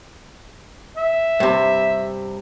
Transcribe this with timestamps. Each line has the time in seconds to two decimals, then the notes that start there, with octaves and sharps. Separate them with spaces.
0.97 E5
1.40 G2 C3